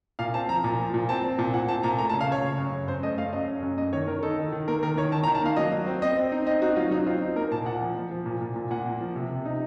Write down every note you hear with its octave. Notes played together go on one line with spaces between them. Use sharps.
A#2 F5
C4 A5
F3 A#5
A#2
F3
A#2
C4 A5
C4
A#2
A#2 F#5
C4 A5
A#2 A#5
A3 A#5
A5
C#3
F5
C#3 C#5
C#3
F#2
C#3
F#2 C5
A3 D#5
A3 F5
F#2 D#5
C#4
F#2
A#3 D#5
D#3 C#5
D#3 A#4
D#4 A4
D#3
D#3
A#3 A#4
D#3 A#4
D#3 C#5
D#3 A5
A#5
D#3
A5
A#3 F5
F#3 D#5
F#3
C4
C4 D#5
C4
D#4
C4 D#5
D#4 F#4
F#3 F4
F#3 D#4
C4 F4
D#4
A#3 A#4
A#2 A5
A#2 F#5
F3
F3
F3
A#2
A#2
A#2
A#2 F#5
A#3
F3
C3
C3
D#4